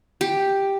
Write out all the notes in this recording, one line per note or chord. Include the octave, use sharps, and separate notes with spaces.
G4